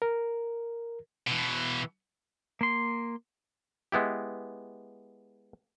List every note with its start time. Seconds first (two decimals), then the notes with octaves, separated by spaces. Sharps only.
0.02 A#4
1.27 B2 E3
2.61 A#3 C6
3.92 G#3 B3 E4 G4